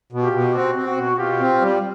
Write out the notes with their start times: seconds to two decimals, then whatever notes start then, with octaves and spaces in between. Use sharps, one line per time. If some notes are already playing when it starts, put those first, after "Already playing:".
0.12 B2
0.23 F4 G4
0.33 B2
0.54 C4 F#4
0.75 C4
0.86 F#4
0.97 B2
1.18 B2 F4 G4
1.39 C4
1.61 G3